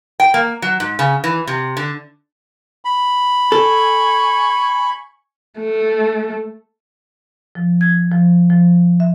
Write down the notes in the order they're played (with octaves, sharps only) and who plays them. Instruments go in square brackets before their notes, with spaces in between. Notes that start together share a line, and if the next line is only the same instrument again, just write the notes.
[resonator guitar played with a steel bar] G5
A#3
F#3
G#2
C#3
E3
C3
D3
[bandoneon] B5
[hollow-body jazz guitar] A4 [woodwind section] G#5 C#6
[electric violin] A3
[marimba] F3
G#6
F3
F3
E5